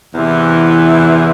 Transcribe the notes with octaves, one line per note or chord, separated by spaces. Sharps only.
E2 C3 E3